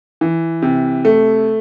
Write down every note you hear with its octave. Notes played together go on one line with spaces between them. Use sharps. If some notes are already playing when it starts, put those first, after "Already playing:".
E3
C3
A3